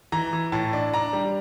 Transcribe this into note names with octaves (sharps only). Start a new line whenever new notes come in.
E3 A#5
E3
A2 A5
D4
D4 A#5
G3